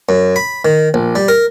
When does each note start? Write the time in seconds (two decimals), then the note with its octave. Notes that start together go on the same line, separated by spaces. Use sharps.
0.09 F#2
0.36 B5
0.65 D#3
0.94 A#1
1.15 G3
1.28 A#4